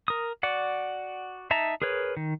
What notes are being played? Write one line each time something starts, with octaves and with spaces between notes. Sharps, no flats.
A#4 D#6
F#4 D5 F#5
D#4 E5 A5 A#5
G#4 A#4 B4 C#5
D#3